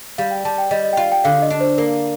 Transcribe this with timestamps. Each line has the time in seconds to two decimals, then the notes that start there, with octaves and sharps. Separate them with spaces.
0.18 G3 F5
0.31 G5
0.45 G3 A5
0.58 G5
0.71 G3 D#5
0.84 D#5
0.93 G5
0.97 F4 F5
1.12 G5
1.24 D3 F5
1.42 D#5
1.50 D4
1.60 C5
1.78 A#3 A#4